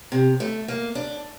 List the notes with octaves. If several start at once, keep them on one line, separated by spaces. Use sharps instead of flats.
C3
A3
A#3
D4